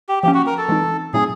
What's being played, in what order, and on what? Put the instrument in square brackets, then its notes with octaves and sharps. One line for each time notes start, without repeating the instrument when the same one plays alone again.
[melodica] G4
[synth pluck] F3 A#3 C#4 [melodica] G4
[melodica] F#4
A#4
A4
[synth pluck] E3 G#3 C4 D#4
[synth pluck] A#2 F#3 A3 C4 D#4 [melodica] G#4